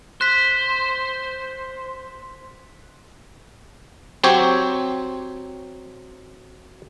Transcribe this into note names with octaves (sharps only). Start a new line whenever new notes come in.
C5 F#6 B6
F#3 C4 G4 C5 C#5